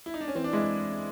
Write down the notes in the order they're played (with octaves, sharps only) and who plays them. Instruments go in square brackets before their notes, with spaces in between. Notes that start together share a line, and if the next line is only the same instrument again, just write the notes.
[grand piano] E4
D#4
D4
C#4
[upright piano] E3 [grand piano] C4
[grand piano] D4
[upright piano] G#3 [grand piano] E4